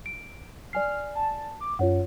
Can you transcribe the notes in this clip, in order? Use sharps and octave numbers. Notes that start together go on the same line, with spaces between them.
D7
D5 G#5 F6 C7
A5
D6
F#2 F4 C#5 F#5